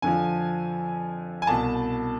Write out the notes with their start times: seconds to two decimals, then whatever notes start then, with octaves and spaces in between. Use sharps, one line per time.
0.02 F2 D3 F3 G#5
1.42 G#5
1.47 C2 B2 A5